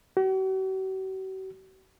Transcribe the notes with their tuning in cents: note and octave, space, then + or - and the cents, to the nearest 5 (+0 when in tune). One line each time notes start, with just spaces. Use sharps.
F#4 +45